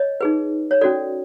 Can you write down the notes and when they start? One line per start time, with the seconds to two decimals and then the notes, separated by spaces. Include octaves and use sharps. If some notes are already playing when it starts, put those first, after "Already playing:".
Already playing: C#5 D#5
0.21 D#4 G#4 B4
0.71 C#5
0.81 C#4 F#4 A4 D5